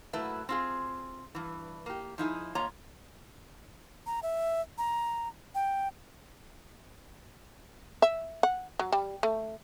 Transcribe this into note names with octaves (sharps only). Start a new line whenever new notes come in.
F#3 A3 A#3 E4 B4 E5
C4 F4 G#4
G2 E3
A#3 G4
F3 D#4 E4 G#4
A#3 F4 C#5 D#5 A#5
A#5
E5
A#5
G5
E5
F#5
F#3
G3
A3